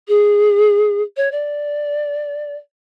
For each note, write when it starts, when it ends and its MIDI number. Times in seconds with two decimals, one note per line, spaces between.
0.08 1.02 68
1.17 1.31 73
1.32 2.56 74